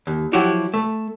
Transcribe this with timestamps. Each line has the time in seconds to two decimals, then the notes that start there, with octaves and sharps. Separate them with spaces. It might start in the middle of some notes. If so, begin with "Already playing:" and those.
0.07 D#2
0.33 F3 F#3 E4 F#4 G4
0.74 A3